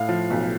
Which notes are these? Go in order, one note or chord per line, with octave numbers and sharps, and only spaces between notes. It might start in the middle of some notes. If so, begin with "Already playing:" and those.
Already playing: A2 F5
F3
B1